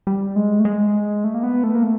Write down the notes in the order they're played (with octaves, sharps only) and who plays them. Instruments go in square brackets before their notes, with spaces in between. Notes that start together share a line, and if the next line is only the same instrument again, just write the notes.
[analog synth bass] G3
G#3
A3
G#3
A3
A#3
B3
A3
A#3
A3